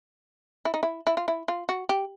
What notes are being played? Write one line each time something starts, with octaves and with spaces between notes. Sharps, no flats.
E4
D#4
E4
E4
F4
E4
F4
F#4
G4